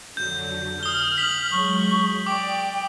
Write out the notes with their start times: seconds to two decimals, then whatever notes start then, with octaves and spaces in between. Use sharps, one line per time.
0.17 F2 D3 F#3 G6
0.83 D#6 F6 G7
1.18 B6 F#7
1.51 F#3 G#3 C#6
2.26 D5 G5 D6